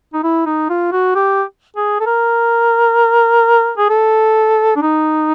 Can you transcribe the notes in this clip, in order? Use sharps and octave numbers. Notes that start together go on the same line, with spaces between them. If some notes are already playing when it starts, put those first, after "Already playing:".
D#4
E4
D#4
F4
F#4
G4
G#4
A4
A#4
G#4
A4
D4
D#4